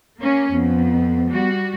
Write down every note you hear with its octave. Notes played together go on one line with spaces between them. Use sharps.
A#3 C#4
F2 B3
G3 F#4